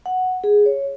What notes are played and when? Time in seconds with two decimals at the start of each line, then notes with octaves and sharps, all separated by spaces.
0.06 F#5
0.44 G#4
0.66 C#5